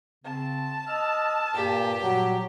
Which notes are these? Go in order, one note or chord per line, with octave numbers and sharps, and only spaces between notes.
C#3 C4 A5
D#5 E6 F6
G2 A#2 G4
A#2 F#3 G3